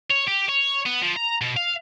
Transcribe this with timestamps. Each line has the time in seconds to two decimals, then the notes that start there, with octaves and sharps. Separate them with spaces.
0.10 C#5
0.27 G4
0.49 C#5
0.86 B3
1.02 F3
1.16 A#5
1.41 B2
1.56 F5